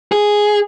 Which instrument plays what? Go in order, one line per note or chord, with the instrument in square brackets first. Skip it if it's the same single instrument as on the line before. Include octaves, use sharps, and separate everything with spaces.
[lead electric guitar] G#4